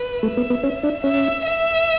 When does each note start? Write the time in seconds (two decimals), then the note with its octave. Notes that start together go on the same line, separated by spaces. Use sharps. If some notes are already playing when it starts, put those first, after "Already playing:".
Already playing: B4
0.23 A3 E5
0.37 B3
0.50 B3
0.63 C#4
0.83 D4
1.04 C#4 E5
1.45 E5